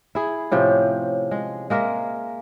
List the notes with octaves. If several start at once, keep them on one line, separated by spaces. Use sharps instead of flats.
E4 G#4
A2 C3 F3 C#4
G#3
G#3 A#3 A#4 E5